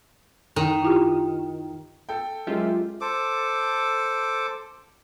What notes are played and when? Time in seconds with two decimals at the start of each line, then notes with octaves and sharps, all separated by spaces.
0.56 F#2 D#3
0.82 E4 F4 G4
2.09 A4 G5
2.47 F#2 G#3 F4 G4 E5
3.01 A4 C5 D6